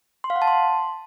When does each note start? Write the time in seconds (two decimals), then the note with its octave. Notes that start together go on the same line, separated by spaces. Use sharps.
0.24 C6
0.30 F5
0.36 F#5
0.42 A5
0.47 C6